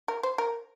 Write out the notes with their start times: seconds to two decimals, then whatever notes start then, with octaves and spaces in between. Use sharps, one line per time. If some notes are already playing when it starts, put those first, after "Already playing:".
0.08 A#4
0.23 C5
0.38 A#4